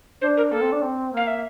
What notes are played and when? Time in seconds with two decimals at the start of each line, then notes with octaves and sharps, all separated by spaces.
0.21 D4 C5
0.37 A#4
0.52 A#3 A4
0.61 C4
0.72 D4
0.82 C4
1.13 A#3 F5
1.27 E5